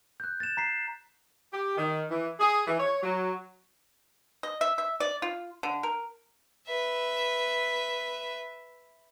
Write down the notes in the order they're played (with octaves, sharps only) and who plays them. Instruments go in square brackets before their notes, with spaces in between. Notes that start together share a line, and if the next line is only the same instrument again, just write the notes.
[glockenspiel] F#6 G6
A6 E7
A#5 B6 C7
[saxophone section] G4
D#3
E3
G#4
E3
C#5
F#3
[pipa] D#5
E5
E5
D5
F4
D3
A#4
[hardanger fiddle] B4 E5